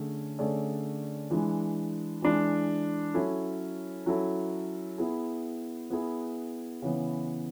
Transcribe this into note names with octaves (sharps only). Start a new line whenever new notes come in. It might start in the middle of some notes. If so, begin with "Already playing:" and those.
Already playing: D3 A3 C#4 G#4
D3 A3 C#4 G#4 D5
E3 G#3 D4
E3 G#3 D4
F#3 C#4 E4 A4
F#3 C#4 E4 A4
B3 E4 G#4
B3 E4 G#4
C#3 E3 B3